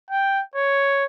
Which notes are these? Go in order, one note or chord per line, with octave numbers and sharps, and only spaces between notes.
G5
C#5